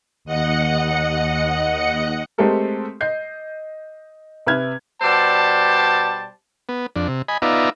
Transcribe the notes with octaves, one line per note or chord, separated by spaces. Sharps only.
D#2 D#5 F#5 C#7
G#3 A3 C4 G4 A4 A#4
D#5 G6 C7
C3 B4 E5 F6 G#6
B2 G3 C5 D5 A5
B3
F2 D4
C3
D#5 G#5 B5
B3 D#4 F4 D5 E5 A#5